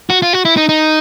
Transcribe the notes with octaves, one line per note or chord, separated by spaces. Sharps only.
F#4
F4
F#4
E4
D#4
D#4